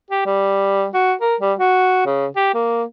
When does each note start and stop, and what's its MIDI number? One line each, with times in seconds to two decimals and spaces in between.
0.10 0.24 67
0.26 0.86 55
0.94 1.13 66
1.21 1.35 70
1.41 1.53 55
1.59 2.01 66
2.06 2.26 49
2.36 2.52 67
2.54 2.83 58